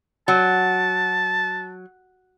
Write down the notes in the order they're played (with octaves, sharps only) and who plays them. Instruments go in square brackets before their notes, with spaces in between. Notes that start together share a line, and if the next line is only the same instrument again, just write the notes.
[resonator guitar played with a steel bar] F#3 [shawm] A5